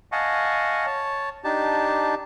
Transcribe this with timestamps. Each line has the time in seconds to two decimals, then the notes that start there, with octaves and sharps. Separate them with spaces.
0.12 D#5 F5 F#5 G#5 A5 C#6
0.86 C#5 A5
1.44 D4 D#4 G4 A5